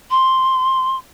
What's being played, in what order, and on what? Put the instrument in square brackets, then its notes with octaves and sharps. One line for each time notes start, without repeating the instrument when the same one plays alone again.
[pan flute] C6